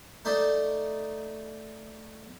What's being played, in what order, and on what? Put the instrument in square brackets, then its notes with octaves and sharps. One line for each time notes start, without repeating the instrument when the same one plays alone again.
[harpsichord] A3 D#4 C5 D5